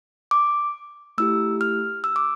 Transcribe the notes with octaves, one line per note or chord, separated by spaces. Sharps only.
D6
A3 E4 G4 E6
F6
E6
D6